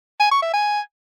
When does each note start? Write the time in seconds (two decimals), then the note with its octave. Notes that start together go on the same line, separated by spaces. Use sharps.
0.20 G#5
0.31 C#6
0.43 E5
0.54 G#5